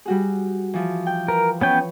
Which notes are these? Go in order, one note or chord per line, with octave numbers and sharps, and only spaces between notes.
G3 F#4 G#4
E3 F3
G5
A#4 B4
B3 C#4 B4 C#5 G5